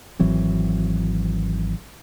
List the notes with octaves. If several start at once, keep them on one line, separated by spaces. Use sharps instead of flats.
G#1 E3 F#3 C4